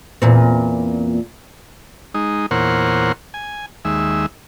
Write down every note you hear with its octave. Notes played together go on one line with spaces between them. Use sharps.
E2 A#2 C4
G#3 D#4
E2 A#2 A#4 C5 C#5 F#5
G#5
D#2 G#3 E5